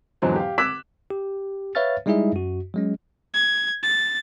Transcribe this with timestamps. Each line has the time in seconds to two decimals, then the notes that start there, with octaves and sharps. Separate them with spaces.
0.22 E2 G#2 D3 F3 F#3 C4
0.36 G4 F5
0.58 D6 E6 F#6 G#6 B6 E7
1.10 G4
1.75 B4 C#5 E5 F5 F6 A6
2.06 G3 G#3 D#4 E4 G#4 E5
2.33 F#2 F#4
2.74 F#3 G#3 C#4
3.34 G#6
3.83 A6